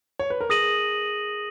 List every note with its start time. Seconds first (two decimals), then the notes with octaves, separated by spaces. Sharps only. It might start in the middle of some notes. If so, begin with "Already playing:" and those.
0.19 C#5
0.30 B4
0.41 A#4
0.49 G#4 D#6 A#6 D#7 F#7